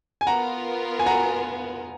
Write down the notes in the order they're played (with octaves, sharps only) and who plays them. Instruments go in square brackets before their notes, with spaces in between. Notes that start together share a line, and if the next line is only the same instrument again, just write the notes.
[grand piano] G#5
[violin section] B3 F4 A#4 [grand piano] F#5 A#5
[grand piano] G#5
F#5 A#5